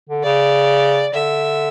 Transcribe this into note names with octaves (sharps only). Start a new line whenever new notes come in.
D3
C#3 D5
D3 E5